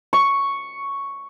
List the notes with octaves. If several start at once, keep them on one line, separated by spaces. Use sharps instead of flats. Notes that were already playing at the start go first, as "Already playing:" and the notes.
C#6